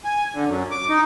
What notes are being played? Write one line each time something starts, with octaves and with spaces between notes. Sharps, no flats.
G#5
D3
F#2
D6
D#4